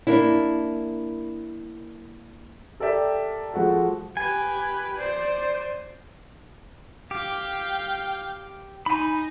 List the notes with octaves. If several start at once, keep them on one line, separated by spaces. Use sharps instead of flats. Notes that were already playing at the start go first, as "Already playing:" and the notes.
A#3 D4 E4
G4 A4 A#4 D5 E5 G5
F3 G#3 F#4 A4
G4 B4 G#5
C5 D5
G4 F5 G5
D#4 G#5 B5